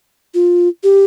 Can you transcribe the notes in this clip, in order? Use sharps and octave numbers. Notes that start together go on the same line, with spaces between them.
F4
G4